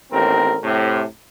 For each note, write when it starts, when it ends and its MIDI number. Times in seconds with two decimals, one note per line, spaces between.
0.11 0.57 33
0.11 0.57 39
0.11 0.57 60
0.11 0.57 70
0.63 1.03 45
0.63 1.03 48